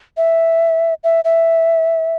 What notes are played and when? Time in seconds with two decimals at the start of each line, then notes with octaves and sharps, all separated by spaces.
0.17 E5
1.04 E5
1.25 E5